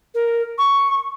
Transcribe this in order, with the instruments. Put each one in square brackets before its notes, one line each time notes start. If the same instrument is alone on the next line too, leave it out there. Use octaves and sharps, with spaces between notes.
[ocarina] A#4
C#6